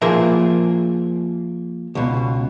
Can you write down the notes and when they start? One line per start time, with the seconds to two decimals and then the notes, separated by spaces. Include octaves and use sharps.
0.02 F3 A#3 G#4 A#4 E5
1.95 C#2 B2